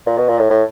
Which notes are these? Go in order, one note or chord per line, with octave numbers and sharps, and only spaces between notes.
A#2
B2
A#2
A2
A2